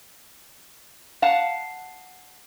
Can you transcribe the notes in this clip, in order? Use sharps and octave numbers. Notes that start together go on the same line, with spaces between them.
F5 F#5 A5